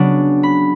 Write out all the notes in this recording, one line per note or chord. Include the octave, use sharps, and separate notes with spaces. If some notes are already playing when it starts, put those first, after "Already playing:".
Already playing: C#3 F#3 B3 D4
B5